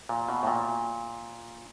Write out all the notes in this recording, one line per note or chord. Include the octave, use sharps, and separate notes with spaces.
A#2
B2
A2
A#2